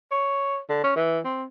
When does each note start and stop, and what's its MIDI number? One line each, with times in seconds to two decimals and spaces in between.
0.11 0.59 73
0.69 0.80 50
0.84 0.93 61
0.96 1.19 52
1.25 1.45 60